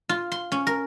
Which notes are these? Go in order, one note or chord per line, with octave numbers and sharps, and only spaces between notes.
F4
C6
C#4
A#4